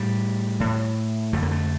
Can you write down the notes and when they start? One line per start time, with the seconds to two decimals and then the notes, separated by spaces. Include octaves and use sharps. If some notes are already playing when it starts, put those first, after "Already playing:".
Already playing: A2 G3
0.60 A2
1.33 F2 D3 A3
1.42 A#3
1.51 A3